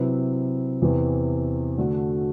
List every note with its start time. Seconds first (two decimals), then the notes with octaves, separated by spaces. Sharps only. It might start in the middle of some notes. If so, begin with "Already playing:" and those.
Already playing: C3 F#3 C4 E4 B4
0.82 E2 C3 E3
1.77 D3 A3 D4 F#4